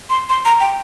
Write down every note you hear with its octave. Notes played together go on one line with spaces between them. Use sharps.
C6
C6
A#5
G5